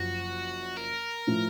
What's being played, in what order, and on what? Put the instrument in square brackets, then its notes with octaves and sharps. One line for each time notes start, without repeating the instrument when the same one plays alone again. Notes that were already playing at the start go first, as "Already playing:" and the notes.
Already playing: [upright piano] F#1 F#2 F3 [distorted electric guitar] F#4
[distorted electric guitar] A#4
[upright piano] A2 F3